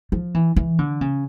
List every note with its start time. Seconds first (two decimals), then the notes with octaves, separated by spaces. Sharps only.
0.12 F3
0.34 E3
0.56 E3
0.79 D3
1.01 C#3